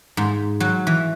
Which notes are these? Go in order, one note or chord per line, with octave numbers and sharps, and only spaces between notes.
G#2
F#3
E3